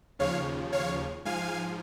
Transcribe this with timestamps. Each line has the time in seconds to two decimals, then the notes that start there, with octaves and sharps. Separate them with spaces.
0.19 D#2 C#3 F3 C#5 F5
0.73 C#5 F5
1.25 G#2 F3 F5 G#5